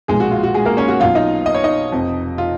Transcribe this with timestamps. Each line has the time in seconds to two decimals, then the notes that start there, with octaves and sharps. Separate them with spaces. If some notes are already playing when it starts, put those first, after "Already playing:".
0.08 B1 A#2 F3 G#3 G#4
0.20 F#4
0.31 F4
0.43 F#4
0.54 G#3 G#4
0.65 A#3 A#4
0.77 C#4 C#5
0.88 F#4 F#5
1.00 B1 B2 F#3 F4 F5
1.15 D#4 D#5
1.46 D#5
1.55 C#5
1.64 D#4 D#5
1.92 F1 F2 F3
2.38 F4